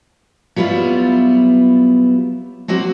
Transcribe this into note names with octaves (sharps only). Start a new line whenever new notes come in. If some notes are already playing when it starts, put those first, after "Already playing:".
F#3 G3 B3 E4 F4
F#3 A#3 C4 F#4